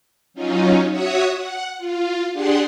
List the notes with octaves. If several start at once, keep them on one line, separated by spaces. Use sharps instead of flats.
F#3 C#4 D#4 F4
F#4 C#5 E5 F#5 D#6
F#5
F4
D4 G4 G#4 F#5 C6